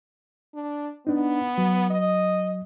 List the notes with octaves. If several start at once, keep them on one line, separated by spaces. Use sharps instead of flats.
D4
B3 D4 D#4
F#3
D#5